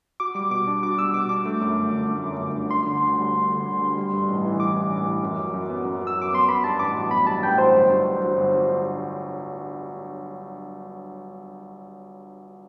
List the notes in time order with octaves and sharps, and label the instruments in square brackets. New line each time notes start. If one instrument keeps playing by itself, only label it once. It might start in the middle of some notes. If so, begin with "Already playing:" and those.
[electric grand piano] F#4 [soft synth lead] D6
[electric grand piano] G3 [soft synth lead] D6
[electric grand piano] B2 [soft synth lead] D6
[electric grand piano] D4
[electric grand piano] F#4 [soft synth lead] D6
[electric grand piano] G3 [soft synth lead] E6
[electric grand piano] B2 [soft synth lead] D6
[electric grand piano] D4 [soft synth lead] D6
[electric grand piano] A3
F#2
G1
D3
A3
F#2
G1
D3
[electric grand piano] D4 [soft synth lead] C6
[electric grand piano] D3
D2
G3
D4
D3
D2
G3
G3
G2
A1
E3
[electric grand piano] G3 [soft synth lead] D6
[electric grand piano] G2
A1
E3
F#2
F#3
F#2
B3
F#2
F#3
[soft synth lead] E6
[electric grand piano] F#2 [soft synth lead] D6
[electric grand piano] B3 [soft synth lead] C6
[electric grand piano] B3 [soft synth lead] B5
[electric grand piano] G2 [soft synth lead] A5
[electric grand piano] A1 [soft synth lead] D6
[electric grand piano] F#3
[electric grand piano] B3 [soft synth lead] B5
[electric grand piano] G2 [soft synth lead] A5
[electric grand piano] A1 [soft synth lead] G5
[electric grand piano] F#3 [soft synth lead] C5
[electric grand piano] G1
G2
G1
F#3
G1
G2